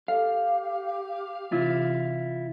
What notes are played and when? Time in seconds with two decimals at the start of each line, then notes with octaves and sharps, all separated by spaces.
0.08 G4 A4 F5
1.52 C3 E3 C4 E4 F4